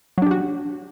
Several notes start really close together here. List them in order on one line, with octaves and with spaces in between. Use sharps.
F#3 D4 G4 F#4